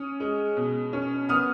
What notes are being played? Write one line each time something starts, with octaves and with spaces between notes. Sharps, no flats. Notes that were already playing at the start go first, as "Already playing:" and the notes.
Already playing: C#4 D#6
G#3
B2
C#4
B3 D#6 F6